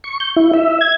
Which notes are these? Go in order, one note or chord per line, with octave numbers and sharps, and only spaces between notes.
C#6
G6
E4
E5
G#6